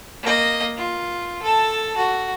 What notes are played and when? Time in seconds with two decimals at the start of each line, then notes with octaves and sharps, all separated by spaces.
0.22 A#3 D#5
0.77 F4
1.42 A4 A5
1.97 F#4